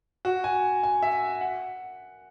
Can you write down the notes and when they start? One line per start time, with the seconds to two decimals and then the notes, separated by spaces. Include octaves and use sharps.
0.25 F#4
0.44 G#5
0.83 G#5
1.02 E5
1.41 F#5